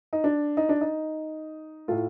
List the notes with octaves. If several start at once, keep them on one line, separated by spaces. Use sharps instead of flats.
D#4
D4
D#4
D4
D#4
A2 A3 F4